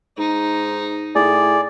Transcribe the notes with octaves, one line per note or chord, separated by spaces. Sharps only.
G#2 D#4
A2 G#4 D5